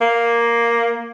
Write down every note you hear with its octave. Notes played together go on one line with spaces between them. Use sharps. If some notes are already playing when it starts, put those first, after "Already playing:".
A#3